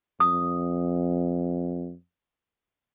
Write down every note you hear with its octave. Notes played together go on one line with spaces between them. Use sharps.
F2 D#6